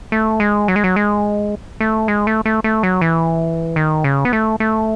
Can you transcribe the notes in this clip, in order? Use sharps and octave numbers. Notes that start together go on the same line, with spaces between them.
A3
G#3
F#3
G#3
F#3
G#3
A3
G#3
A3
A3
A3
F#3
E3
D#3
C#3
B3
A3
A3